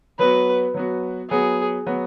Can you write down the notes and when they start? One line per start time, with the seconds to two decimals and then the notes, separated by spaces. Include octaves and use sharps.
0.19 F#3 B3 F#4 B4
0.74 F#3 B3 F#4
1.30 F#3 B3 F#4 G#4
1.86 F#3 B3 F#4